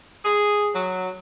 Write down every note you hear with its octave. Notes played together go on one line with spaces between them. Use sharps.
G#4
F#3